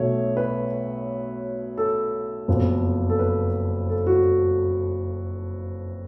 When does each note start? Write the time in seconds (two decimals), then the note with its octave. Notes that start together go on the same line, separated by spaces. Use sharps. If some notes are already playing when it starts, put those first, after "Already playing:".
Already playing: B1 B2 A3 C#5
0.37 B4
1.78 A4
2.48 F#1 F2 F3 B3
3.10 A4
3.19 B4
3.89 A4
4.07 F#4